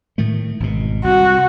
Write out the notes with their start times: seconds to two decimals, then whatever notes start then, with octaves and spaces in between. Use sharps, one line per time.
0.18 A2 D#3 A3
0.60 G#1 B2
1.04 C2 F#4